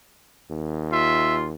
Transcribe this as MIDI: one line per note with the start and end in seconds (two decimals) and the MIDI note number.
0.50 1.53 39
0.92 1.44 65
0.92 1.36 76